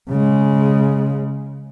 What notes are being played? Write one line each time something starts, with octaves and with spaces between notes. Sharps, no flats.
C#3 G#3